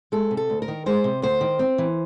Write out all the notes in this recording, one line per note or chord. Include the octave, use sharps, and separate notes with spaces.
G#3 A4
C3
A4
D2
A#4
D#3
G#3 C5
C3
D2 C5
D#3
C4
E3